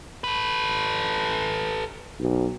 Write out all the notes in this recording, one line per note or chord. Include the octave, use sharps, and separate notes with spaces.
A4 B4
B1